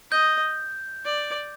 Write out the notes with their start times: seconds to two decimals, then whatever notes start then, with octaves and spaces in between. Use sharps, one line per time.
0.12 D#5 G6
1.05 D5